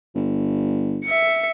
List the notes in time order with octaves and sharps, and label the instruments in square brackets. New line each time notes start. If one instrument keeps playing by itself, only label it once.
[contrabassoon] G1
[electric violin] E5 C#7